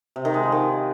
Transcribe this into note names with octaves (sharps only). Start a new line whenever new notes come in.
C3
D#3
G#3
F3
D#3